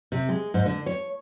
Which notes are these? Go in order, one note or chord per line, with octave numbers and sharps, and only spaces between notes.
C3
G#3
G#2
D3
C#5